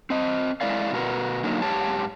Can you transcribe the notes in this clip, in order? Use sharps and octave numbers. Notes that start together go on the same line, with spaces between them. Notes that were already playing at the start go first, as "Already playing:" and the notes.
C4 D#5
G#3 E4 A#4 D5 F5
B2 F#4 A#4 B4
D3 F#3 A#3 D#4
G#2 G4 C#5 A5